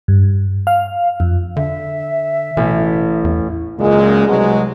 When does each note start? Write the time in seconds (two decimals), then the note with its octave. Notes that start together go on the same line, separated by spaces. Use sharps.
0.08 G2
0.67 F5
1.20 F2
1.57 D3 E5
2.57 A1 B2
3.25 E2
3.79 C#2 F#2 A#2 G#3
4.27 C2 B2 F#3 G#3